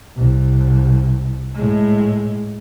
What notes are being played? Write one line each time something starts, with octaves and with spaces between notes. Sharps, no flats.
C2
A2 G#3